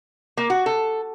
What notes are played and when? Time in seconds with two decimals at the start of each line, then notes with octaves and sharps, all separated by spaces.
0.37 A#3
0.50 F#4
0.66 A4